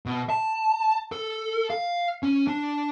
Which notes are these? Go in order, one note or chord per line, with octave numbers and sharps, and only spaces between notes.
B2
A5
A4
F5
C#4
D4